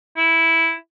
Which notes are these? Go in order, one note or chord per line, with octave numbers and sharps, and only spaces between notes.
E4